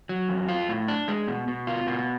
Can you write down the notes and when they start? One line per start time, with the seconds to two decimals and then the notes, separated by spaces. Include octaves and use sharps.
0.09 F#3
0.29 F2
0.48 F4
0.69 A2
0.88 D4
1.08 G#3
1.28 B2
1.48 B2
1.67 F4
1.87 B2